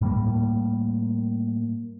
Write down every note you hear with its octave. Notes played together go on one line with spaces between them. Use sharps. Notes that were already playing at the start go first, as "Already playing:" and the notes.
A2 G3 A3 A#3